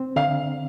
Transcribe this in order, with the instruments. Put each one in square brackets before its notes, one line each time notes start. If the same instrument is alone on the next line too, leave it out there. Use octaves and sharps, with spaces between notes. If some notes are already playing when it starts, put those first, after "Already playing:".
Already playing: [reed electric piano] C4
[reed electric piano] D3 [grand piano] F5